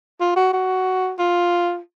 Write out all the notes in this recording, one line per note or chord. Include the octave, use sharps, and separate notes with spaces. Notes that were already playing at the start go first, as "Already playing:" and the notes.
F4
F#4
F#4
F4